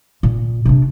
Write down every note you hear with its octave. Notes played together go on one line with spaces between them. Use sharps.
A#2
C3 D4